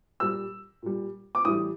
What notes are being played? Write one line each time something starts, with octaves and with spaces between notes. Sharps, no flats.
A#2 G3 E6
A#2 G3
D6
A2 E3 G3 D#6